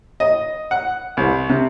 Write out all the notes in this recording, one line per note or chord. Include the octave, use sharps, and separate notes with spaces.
D#5
F#5
C2
C3